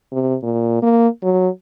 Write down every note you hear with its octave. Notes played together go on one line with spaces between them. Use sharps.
C3
A#2
A#3
F#3